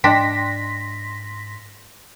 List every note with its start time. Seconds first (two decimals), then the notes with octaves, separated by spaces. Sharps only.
0.04 G#2 D4 D#5 G5 C6 A#6 B6